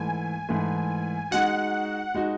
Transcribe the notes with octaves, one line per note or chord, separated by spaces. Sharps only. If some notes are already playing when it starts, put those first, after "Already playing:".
Already playing: G#2 E3 A3 G#5
G#2 E3 A3
G#3 D#4 F#4 F#5
G#3 D#4 F#4